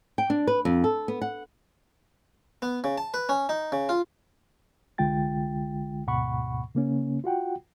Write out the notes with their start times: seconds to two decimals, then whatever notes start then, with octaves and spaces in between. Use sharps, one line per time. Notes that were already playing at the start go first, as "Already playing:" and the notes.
0.18 G5
0.30 D4
0.47 B4
0.65 F2
0.84 A4
1.08 B3
1.22 F#5
2.62 B3
2.84 C#3
2.98 A5
3.14 B4
3.29 C#4
3.49 D#4
3.72 C#3
3.89 F4
4.98 C2 D3 G#3 F4 G5 A6
6.07 D2 G#2 B2 F#5 B5 C#6
6.75 C#3 A#3 C#4
7.24 F4 F#4 F#5 G5